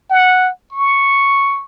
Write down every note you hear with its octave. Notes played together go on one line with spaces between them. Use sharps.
F#5
C#6